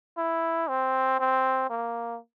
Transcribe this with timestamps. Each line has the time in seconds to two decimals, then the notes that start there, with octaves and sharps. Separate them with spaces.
0.18 E4
0.69 C4
1.20 C4
1.70 A#3